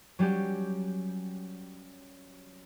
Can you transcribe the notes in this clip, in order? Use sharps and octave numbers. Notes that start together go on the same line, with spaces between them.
F#3 G3 C#4 G4